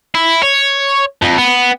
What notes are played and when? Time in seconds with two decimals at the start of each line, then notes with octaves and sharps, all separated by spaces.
0.15 E4
0.43 C#5
1.22 F2
1.38 B3